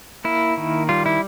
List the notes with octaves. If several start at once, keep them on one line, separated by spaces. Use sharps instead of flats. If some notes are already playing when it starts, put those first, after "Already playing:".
A#3 E4
D#3
G3 F4
E4